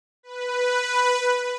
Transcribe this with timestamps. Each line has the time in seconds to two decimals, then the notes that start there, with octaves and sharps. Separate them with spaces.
0.23 B4